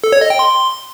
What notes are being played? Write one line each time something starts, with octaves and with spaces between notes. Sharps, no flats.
A4
C#5
D#5
G5
C6